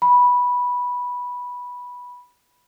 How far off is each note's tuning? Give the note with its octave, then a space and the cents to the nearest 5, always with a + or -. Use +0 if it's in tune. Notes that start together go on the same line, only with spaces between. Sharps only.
B5 -10